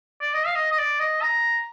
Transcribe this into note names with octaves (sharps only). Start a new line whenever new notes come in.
D5
D#5
F5
D#5
D#5
D5
D#5
A#5